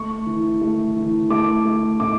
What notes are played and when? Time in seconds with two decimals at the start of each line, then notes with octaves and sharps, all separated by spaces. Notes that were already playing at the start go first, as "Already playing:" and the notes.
Already playing: A3 C#6
0.26 E3
0.61 A3
0.96 E3
1.30 A3 D6
1.65 A3
2.00 A2 D6